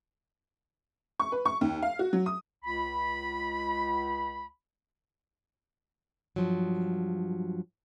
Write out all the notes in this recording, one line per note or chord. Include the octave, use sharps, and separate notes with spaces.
C#6
B4
C#6
D#2
F5
F#4
F#3
D#6
C#2 B5
G2 F3 F#3